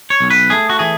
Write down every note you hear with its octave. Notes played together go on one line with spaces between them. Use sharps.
C#5
B1
B4
A3 G#4
F#4
E3 G#4